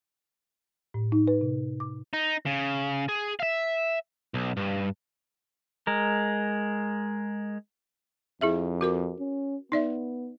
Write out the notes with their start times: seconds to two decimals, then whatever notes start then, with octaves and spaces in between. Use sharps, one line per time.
0.94 A2
1.12 D#4
1.28 B4
1.41 C3
1.80 D6
2.13 D#4
2.46 C#3
3.09 G#4
3.40 E5 F5
4.34 B1
4.57 G2
5.87 G#3 A#4
8.41 F2 E4 G#4 E5
8.81 F#4 A#4 D6
9.19 C#4
9.72 B3 D#4 D5 E5